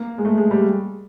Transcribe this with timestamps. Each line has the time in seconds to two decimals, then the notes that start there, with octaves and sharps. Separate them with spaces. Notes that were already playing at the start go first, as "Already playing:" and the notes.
Already playing: A#3
0.18 G#3
0.25 A3
0.38 G#3
0.51 G3